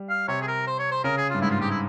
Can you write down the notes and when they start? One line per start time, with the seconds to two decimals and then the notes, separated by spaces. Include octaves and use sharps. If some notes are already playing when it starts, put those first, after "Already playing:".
Already playing: G3
0.10 F5
0.28 C3 C#5
0.41 G#4
0.48 A#4
0.67 C5
0.79 C#5
0.91 C5
1.04 C#3 A#4
1.17 G#4
1.30 G2 F4
1.42 G#2 E4
1.51 F4
1.60 G#2 G4
1.70 E4